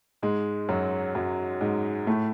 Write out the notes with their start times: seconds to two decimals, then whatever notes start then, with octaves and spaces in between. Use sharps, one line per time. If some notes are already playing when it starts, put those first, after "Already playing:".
0.22 G#2 G#3
0.69 F#2 F#3
1.15 F#2 F#3
1.61 G#2 G#3
2.07 A2 A3